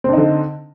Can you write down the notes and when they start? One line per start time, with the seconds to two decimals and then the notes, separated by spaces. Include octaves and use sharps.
0.04 C4
0.09 D4
0.13 D#4
0.17 D3